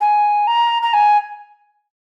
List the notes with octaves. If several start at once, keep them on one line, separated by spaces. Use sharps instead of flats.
G#5
A#5
A#5
G#5